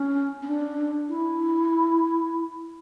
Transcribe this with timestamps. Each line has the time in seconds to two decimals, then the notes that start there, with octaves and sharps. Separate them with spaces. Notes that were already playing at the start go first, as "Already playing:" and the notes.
Already playing: C#4
0.42 C#4
0.48 D4
1.09 E4